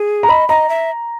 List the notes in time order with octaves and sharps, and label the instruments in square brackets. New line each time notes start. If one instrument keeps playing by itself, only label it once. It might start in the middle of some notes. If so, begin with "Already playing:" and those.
Already playing: [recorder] G#4
[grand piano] A#5
[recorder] D#5 [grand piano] B5
[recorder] D#5 [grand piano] A#5
[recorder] E5